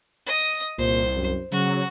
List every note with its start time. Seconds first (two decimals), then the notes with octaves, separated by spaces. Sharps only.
0.26 D#5 D#6
0.78 C2 A#2 C5
1.16 F#2
1.52 C#3 F#3 F#4